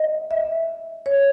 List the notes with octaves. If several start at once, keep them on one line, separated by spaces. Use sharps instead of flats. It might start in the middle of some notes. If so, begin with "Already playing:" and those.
Already playing: D#5
E5
C#5